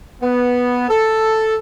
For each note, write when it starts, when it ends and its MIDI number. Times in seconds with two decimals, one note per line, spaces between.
0.22 0.86 59
0.89 1.56 69